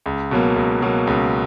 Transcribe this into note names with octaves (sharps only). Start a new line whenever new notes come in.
C#2
B2 F#3 A#3
C#2
B2 F#3 A#3
C#2